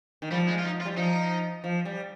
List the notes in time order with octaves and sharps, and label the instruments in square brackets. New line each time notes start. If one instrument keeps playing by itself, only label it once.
[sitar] D#3
[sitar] F3 [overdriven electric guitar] G3
[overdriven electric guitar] G#3
F4
D#4
F4
[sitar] G3
[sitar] F3 [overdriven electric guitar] D#4
[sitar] F3
G3